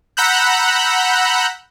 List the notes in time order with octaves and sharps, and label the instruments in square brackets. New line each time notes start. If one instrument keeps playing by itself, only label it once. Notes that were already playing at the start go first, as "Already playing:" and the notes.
[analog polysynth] F#5 A#5 B5 E6 F#6 G6